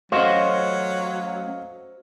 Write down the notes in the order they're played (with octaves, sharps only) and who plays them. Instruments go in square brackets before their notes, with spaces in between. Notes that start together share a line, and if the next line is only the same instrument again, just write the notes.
[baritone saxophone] F#3 [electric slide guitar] A3 C#4 [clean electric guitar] F#4 C5 [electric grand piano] D#5 F5 C#6